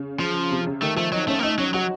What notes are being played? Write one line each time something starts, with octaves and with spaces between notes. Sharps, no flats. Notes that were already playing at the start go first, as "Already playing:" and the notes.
Already playing: C#3
F3
C3
C#3
D#3 A3
F3 A3
F#3 D#4
A3 C#4
A#3
A3 D#4
F#3 C#4
F#3 F#4